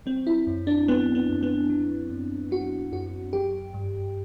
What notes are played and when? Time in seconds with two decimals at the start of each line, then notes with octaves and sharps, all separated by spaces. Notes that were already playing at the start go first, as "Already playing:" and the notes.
0.06 F#3 C4
0.27 E4
0.47 F#2
0.67 D4
0.88 F#3 B3
1.15 B3
1.29 F#2
1.43 B3
1.70 F#3
2.10 F#2
2.51 F#3 F#4
2.92 F#2 F#4
3.33 F#3 G4
3.74 G2